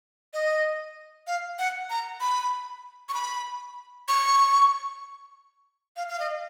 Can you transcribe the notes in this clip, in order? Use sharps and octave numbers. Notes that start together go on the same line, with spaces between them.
D#5
F5
F#5
A#5
B5
C#6
B5
C#6
F5
F5
D#5